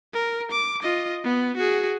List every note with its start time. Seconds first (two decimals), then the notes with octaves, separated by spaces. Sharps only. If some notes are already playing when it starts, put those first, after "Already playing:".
0.14 A#4
0.52 D6
0.82 F4 D#5
1.24 B3
1.56 F#4 G#4